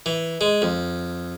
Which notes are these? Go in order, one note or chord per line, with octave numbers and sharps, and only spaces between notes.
E3
G#3
F2